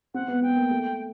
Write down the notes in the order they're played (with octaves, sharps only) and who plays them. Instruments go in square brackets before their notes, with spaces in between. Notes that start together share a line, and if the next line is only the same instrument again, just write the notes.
[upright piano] C4 [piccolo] F#5
[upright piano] B3
[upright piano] B3 [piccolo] G5
[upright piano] A#3
A3